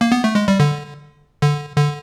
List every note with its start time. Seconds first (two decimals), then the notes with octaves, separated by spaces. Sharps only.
0.01 A#3
0.12 B3
0.24 A3
0.35 G#3
0.48 G3
0.60 D3
1.42 D3
1.76 D3